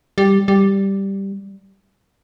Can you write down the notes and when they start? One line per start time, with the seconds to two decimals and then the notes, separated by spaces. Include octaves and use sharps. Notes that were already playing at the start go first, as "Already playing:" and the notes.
0.18 G3
0.48 G3